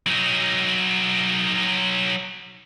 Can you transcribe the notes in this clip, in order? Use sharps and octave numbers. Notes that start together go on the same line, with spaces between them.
F#3 D#4